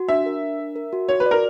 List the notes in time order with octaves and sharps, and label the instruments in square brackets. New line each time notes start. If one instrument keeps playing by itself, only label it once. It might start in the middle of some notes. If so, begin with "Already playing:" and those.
Already playing: [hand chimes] F#4
[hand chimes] D4 [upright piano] E5
[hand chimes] A#4
D4
A#4
A#4
F#4
[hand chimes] F#4 [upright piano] C#5
[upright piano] B4
[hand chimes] D5
[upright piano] A#4